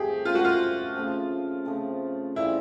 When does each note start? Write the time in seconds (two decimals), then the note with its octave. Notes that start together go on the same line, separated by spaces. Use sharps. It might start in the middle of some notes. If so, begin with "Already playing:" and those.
Already playing: F3 A3 C4 G4 G#4
0.24 C#3 F3 A3 C4 F4
0.35 F#4
0.45 F4
0.96 C#3 F3 A3 C4
1.65 C#3 F3 A3 C4
2.35 C#3 E3 G3 C4 E4